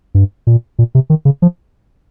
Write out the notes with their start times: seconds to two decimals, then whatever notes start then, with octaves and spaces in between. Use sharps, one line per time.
0.15 G2
0.47 A#2
0.79 A#2
0.95 C3
1.10 D#3
1.25 C#3
1.42 F3